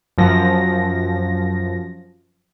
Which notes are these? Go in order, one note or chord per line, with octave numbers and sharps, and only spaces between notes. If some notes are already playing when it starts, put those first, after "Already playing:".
F#2 F3 A#6